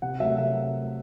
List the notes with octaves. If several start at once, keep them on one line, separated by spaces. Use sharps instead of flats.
C3 F#5
F#3 A3 E5
C3 E5